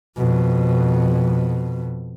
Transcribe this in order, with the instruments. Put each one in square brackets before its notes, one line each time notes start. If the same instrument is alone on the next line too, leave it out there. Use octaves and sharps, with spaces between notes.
[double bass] F2 B2